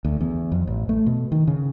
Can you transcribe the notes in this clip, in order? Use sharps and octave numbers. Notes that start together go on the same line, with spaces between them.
D2
E2
F2
A1
A3
B2
D#3
C#3